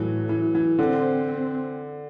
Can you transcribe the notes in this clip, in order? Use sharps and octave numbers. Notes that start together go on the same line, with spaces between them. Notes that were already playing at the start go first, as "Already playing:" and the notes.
Already playing: A2 E3 F#3 A3
E3
E3
D3 C4